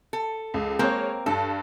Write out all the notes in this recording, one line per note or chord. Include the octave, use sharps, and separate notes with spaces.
A4
C#2
G#3 A#3 C4 A#4 C#5
G2 A4 A5